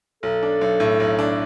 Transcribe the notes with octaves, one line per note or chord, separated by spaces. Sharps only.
B1 A4
D4
B1
A2
B1
D4